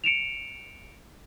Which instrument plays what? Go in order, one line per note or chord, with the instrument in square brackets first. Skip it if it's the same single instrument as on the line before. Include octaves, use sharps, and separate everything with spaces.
[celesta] C#7 D7 E7 F7